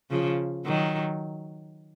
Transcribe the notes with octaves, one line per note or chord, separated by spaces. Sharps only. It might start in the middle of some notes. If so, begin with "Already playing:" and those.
C#3 F3
D#3 F#3